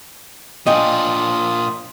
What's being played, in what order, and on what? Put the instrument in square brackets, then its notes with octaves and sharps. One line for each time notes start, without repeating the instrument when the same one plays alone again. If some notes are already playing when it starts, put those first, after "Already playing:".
[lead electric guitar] A#2 D4 [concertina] F4 D#6 [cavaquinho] C#5 G5 G#5 [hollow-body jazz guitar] D#5